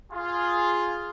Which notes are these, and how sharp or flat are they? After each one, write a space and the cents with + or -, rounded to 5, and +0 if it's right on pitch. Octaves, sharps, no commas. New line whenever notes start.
F4 +0 G#4 +0